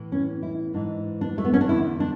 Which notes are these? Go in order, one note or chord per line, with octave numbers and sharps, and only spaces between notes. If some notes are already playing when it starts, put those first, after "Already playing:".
Already playing: A2 E3
C#4
E4
G#2 E3 D4
D4
A3
B3
C#4
D4
E2 D3 E4
D4